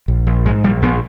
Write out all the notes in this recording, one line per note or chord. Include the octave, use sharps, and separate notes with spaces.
A#1
A#1
G#2 G#3
A#1 G3
A#1 B3